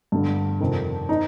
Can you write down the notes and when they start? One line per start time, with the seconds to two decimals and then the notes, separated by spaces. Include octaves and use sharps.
0.12 G2 D3
0.61 F2 C3 D#3
1.09 D#4